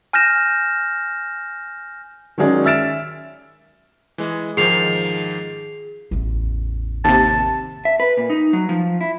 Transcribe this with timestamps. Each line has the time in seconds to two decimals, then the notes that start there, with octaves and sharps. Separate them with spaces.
0.13 G#5 F6 G6 A#6 E7
2.38 D#3 F#3 G#3 C#4 G#4 D5
2.65 E5 E6 F6 A6 D7 E7
4.18 E3 G#3
4.57 G#2 D#3 F3 G#4 C7 F7
6.11 A1 E2
7.04 D#2 C3 A5
7.85 E5
8.00 B4
8.17 A#2
8.30 D#4
8.53 F#3
8.69 F3
9.01 E4